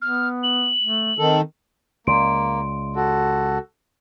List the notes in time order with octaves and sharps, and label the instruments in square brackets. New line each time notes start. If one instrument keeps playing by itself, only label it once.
[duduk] B3 [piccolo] F6
[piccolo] F#7
[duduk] A3
[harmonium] D#3 A4 [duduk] C4
[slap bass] C#2 [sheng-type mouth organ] A#3 [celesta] D5 C6 D7
[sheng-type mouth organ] F#4 A4